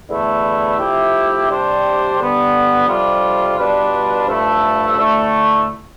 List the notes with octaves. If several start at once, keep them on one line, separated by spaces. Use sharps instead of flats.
E2 D3 A3 E4
F3 A3 E4 G4
C3 G3 D4 G4 C5
D3 G3 B3
F2 C3 G3 D4 F4
B2 G3 D4 F4 B4
G2 F3 A3 E4 A4
D2 D3 A3 E4